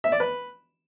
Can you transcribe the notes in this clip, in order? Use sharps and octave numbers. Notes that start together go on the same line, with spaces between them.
E5
D5
B4